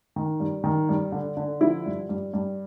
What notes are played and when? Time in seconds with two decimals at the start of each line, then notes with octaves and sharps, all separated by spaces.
0.16 D#3
0.40 G2
0.64 D#3
0.89 G2
1.12 D3
1.37 D3
1.61 F3 E4
1.86 G2
2.09 G2
2.34 G2